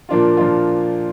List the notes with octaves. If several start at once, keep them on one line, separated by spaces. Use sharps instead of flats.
A#2 F3 A#3 D4 F4
A#2 F3 A#3 D4 F4